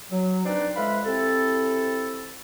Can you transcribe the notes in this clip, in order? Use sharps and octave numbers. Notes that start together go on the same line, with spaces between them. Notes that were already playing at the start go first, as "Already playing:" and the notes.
F#3
C4 D4 D#4 B4 C5 D5
F2 G#3 B4 E5 F5 B5
C3 C4 E4 A4